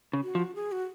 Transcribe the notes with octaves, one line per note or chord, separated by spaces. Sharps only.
C#3
F#4
F3
G#4
F#4